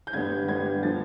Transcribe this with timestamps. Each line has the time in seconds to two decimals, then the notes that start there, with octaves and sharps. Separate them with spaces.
0.07 G6
0.13 G2 D3 G3 B3 G#6
0.48 G2 D3 G3 B3 G#6
0.83 D3 F3 A6